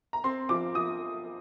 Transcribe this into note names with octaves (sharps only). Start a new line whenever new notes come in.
A#5
C4 C6
F3 D6
F3 D#6